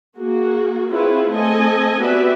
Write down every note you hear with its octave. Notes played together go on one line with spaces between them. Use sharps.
A#3 F#4 G#4
C4 E4 F4 G#4 B4 C#5
A3 C4 A4 D#5 G#5
B3 F#4 G4 B4 D5 E5